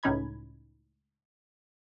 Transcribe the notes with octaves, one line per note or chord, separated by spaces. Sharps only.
C#2 A2 C#4 D#4 B5 G#6